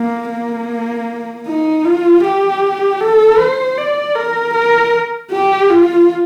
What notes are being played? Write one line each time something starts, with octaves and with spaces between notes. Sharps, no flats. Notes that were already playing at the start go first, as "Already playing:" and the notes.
Already playing: A#3
A#3
D#4
F4
G4
A4
C5
D5
A#4
A#4
G4
F4